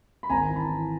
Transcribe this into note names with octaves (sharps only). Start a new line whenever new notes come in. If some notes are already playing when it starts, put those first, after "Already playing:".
B5
G#1 G#5 A#5
E3
A5 B5
E3